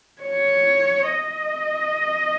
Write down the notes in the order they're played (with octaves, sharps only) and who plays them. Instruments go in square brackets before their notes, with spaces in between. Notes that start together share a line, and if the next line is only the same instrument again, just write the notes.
[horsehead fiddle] C#5
D#5